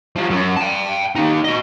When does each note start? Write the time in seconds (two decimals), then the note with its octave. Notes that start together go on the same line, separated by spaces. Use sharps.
0.16 F3 F#3
0.30 F#2
0.56 G5 A5
1.16 A#3 D#4
1.44 F#4 D#5